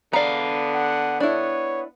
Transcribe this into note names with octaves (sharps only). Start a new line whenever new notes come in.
D3 B3 D5 F5 A#5
F#5
D4 E4 C#5